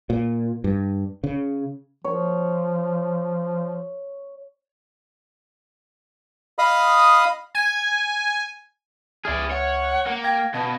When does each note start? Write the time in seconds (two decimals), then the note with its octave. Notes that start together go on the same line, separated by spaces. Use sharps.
0.10 A#2
0.64 G2
1.24 C#3
2.04 F3 C#5
6.59 D#5 F5 B5 D#6
7.55 G#5
9.25 C#2 G#4 D5 E5 F6
9.51 C#5 F#5
10.06 A#3
10.24 F5 G5 G#6 A#6
10.54 B2 A5